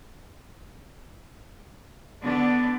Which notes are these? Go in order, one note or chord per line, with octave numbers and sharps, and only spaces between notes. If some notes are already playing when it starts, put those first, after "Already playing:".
D3 B3 D4